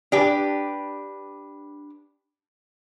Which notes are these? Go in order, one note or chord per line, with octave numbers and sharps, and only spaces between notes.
D4 G4 B4